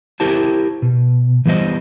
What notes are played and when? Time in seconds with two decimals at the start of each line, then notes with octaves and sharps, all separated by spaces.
0.20 E4 G4 A#4 C5 A5
0.82 B2
1.45 E3 G3 B3 C5 D#5